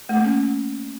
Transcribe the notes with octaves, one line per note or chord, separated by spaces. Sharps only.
A3
A#3
C#4